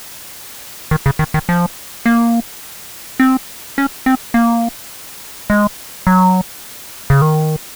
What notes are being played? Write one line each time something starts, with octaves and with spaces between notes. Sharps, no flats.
D#3
C#3
D#3
D#3
F3
A#3
C4
C#4
C4
A#3
G#3
F#3
C#3
D#3